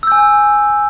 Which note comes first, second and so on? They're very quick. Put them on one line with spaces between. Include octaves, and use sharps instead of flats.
E6 G6 G#5